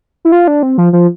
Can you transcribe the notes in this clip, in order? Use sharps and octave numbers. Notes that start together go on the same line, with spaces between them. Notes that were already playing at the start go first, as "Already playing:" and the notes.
E4
F4
D4
C4
F3
F3